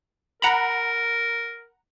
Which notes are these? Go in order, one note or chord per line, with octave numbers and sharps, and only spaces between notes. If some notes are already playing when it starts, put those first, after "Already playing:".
A#4 F#5 A#5 B5